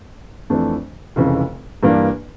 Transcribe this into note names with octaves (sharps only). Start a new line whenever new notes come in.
F2 E3 A3 D4
F1 F2 C#3 E3
G2 E3 A#3 D4